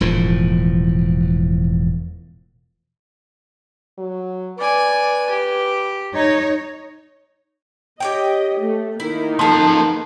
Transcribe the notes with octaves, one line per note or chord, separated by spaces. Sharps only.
E1 A2 F3
F#3
B4 D5 G#5
G4
D#4 C#5
G4 C#5 D#5 G5
A3
D#3 A#3 D#4 E4
F3 B3 G#4 A4